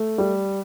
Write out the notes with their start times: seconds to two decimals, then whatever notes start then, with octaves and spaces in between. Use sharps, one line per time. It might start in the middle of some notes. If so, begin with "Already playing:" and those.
Already playing: A3
0.18 G3